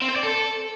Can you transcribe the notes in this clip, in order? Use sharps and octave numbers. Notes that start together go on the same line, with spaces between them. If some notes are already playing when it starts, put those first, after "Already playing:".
C4
C5
D5
A4